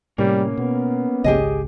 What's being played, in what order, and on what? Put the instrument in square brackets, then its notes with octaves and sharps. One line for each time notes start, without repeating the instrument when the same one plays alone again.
[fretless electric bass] A2 C3 [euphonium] G3 [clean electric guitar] A#3 C#4
[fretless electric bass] B2 [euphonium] B3
[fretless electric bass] G#1 C#2 C#3 [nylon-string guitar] G4 G#4 D#5